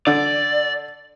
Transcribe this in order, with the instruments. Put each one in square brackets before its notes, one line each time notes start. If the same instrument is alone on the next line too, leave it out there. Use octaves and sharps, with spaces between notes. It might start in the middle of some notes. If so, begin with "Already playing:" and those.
[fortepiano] D3 [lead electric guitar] D5